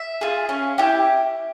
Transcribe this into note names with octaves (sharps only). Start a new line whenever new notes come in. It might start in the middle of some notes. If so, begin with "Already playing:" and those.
Already playing: E5
F4 G#4
C#4
E4 G4